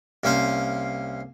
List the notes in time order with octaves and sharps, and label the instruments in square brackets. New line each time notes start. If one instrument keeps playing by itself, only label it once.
[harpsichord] C2 A#3 C#4 C5 F5